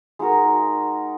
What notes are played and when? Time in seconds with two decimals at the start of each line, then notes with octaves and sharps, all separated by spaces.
0.19 G#3 D#4 F#4 A#4